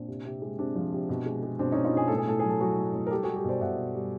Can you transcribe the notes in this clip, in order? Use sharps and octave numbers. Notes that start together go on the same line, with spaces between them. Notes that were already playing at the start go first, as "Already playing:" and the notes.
Already playing: A#2 C4 D4
C3
C3
G#3
C3 C4 D4
F3
C3
B2
G#3
G#3
B2 C4 D4
B2 C#4 D#4
D#4 F4
B2 G#4
A2 A4
G#4
A2 A4
F#3 G#4
A4
F#3 F#4 G#4
A2
A2
A#4
G3 G4 A4
G3 F#4 G#4
G4 A4
B2 C5 D5
B2 E5 F#5
B2
G3